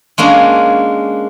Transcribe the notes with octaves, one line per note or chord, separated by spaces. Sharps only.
G#3 A#3 C#4 D4